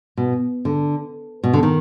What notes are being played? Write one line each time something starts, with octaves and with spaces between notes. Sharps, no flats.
B2
D3
B2
D3
D#3